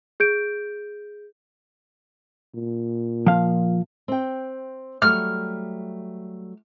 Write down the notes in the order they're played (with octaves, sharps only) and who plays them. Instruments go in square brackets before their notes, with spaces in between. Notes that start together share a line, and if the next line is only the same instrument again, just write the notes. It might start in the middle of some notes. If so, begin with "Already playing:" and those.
[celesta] G#4 G6 D7
[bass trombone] A#2
[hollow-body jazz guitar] F3 F5
[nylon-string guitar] C4 G5
[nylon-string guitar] F#3 G3 A3 [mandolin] F6